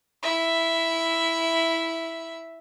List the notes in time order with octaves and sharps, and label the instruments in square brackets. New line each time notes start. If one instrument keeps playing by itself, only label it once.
[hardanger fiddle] E4 E5